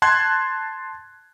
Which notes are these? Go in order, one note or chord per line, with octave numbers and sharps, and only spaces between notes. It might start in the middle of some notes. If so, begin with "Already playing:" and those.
A5 C6 F#6 G#6